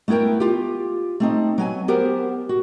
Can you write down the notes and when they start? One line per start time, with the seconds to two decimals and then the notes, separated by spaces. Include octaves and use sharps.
0.08 A3 B3 E4 A#4 G5
0.40 F4 G4
1.20 A3 C4 D#4
1.58 F#3 B3 G#5
1.88 B3 G4 A#4 C5
2.49 F#4